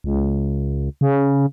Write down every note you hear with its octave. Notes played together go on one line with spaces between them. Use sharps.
C#2
C#3